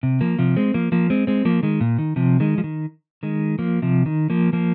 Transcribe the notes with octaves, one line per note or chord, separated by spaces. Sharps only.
C3
F3 A#3
C3 F3
G#3 C4
F3 A#3
F3 A#3
G#3 C4
G#3 C4
F3 A#3
D#3 G#3
A#2
D#3
C3 F3
D#3 G#3
F3
D#3
D#3 G#3
F3 A#3
C3 F3
D#3
F3 A#3
F3 A#3